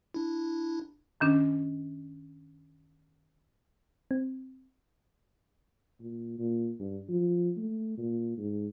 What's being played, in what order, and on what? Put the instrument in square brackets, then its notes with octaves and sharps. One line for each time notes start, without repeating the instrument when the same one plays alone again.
[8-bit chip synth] D4 E4
[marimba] F#2 D#3 C#4 D4
[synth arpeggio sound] C4
[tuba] A#2
A#2
G2
F3
A3
A#2
G#2